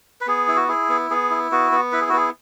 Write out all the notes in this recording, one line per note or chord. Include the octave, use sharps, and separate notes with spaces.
B4
B3 G#4
E4
F#4
E4 G#4
B3
B3 G#4
E4
B3 F#4
B3
E4 B4
G#4
F#4
B3 G#4